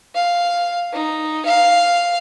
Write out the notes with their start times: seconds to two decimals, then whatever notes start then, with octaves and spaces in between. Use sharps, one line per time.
0.15 F5
0.93 D#4
1.45 F5